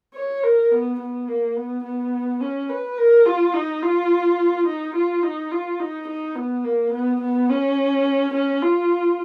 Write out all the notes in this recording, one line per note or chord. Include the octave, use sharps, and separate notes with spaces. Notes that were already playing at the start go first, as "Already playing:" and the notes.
C#5
A#4
B3
B3
A#3
B3
B3
C#4
B4
A#4
F4
D#4
F4
D#4
F4
D#4
F4
D#4
D#4
B3
A#3
B3
B3
C#4
C#4
F4